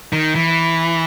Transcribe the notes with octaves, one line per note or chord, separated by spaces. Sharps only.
D#3
E3